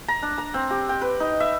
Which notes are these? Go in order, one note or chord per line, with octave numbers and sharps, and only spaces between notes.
A#5
D4
A#5
C4
G4
G5
B4
D#4
E5